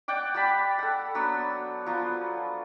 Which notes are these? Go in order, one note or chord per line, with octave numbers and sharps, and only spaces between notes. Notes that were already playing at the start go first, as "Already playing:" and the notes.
D5 F#5 G5 D6
G3 G4 A5 B5
A4 F#5
F#3 B3 D4 E6
F3 F#3 B3